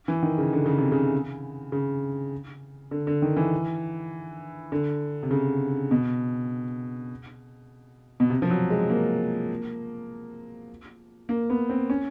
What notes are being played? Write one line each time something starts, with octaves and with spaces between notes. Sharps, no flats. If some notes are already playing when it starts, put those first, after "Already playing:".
E3
D#3
C#3
D3
C#3
C3
C#3
C#3
D3
D3
D#3
E3
D3
C3
C#3
B2
B2
C3
F3
F#3
G#3
A#3
A#3
B3
C4
C#4